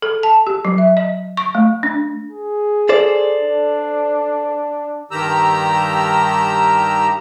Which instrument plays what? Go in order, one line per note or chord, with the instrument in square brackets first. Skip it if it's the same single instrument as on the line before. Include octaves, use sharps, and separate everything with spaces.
[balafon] A4
A5
G4
F#3
E5
D#5
C#6
A3
D4
[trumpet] G#4
[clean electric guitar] A4 C5 D5
[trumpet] D4
[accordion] G2 D#3 G4 A#5 E6